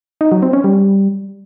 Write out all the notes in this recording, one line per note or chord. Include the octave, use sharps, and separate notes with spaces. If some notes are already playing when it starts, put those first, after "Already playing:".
D#4
F#3
C4
C#4
G3